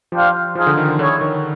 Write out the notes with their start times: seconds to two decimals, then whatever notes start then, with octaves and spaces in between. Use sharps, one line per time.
0.12 F3 D4 G4 C5 F5
0.55 F3 D#4 G#4 C5 F5
0.67 D3
0.77 D#3
0.89 D3
0.99 D3 E4 G#4 C#5
1.21 D#3